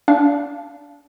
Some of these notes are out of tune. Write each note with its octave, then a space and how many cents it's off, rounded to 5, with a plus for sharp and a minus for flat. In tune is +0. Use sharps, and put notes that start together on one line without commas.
D4 -20 F5 -20